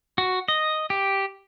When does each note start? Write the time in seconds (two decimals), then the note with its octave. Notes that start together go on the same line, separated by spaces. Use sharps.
0.18 F#4
0.48 D#5
0.90 G4